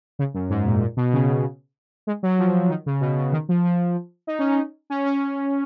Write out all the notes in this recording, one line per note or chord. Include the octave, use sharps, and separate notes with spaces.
C#3
F#2
G#2
A#2
A#2
B2
C#3
G#3
F#3
F3
D#3
C#3
B2
C#3
D#3
F3
F3
D#4
C#4
D#4
C#4
C#4